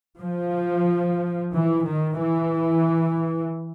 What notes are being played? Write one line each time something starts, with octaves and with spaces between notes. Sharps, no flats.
F3
E3
D#3
E3